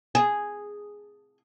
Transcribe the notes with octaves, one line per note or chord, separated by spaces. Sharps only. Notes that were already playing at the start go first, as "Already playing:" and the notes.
G#4